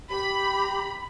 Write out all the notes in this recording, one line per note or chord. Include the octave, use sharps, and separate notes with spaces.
G4 B5